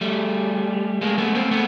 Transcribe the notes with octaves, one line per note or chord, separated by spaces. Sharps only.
G3 A3
G#3 A#3
A3 B3
A#3 C4
A3 B3